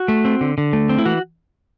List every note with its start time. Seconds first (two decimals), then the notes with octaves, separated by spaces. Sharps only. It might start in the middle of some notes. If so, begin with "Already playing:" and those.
Already playing: F#4
0.08 A3
0.25 C4
0.41 D3
0.58 D3
0.73 A3
0.89 C4
0.98 E4
1.05 E3 F#4